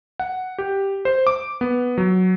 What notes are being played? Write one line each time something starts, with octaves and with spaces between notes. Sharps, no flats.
F#5
G4
C5
D6
B3
F#3